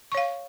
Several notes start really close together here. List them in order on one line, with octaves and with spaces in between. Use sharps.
C#6 C#5 F5